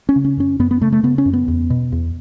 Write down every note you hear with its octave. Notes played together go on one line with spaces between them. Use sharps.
C#4
C#3
C#4
F#2 C#4
F#2 B3
B3
C#3 A3
A3
C#3 B3
C#4
F#2
B3
E2
B2
E2